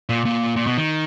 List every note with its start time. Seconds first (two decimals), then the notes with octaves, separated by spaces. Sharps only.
0.09 A#2
0.25 A#2
0.56 A#2
0.67 B2
0.78 D#3